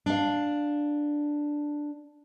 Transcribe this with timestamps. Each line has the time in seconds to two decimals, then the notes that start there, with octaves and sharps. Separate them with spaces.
0.06 D4 F5